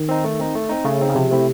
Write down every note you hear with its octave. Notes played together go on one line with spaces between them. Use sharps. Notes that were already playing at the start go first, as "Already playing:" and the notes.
Already playing: D#3
C4 D#4
A3
C4 D#4
A3
C4 D#4
C#3 A3
C4 D#4
C#3
C3 F3
A3 C4 E4